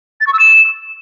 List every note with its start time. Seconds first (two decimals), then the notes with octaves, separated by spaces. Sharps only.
0.21 A6
0.27 C#6
0.33 E6
0.39 E7